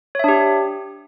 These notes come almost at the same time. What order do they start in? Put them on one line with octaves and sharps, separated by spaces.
C#5 E5 D4 G4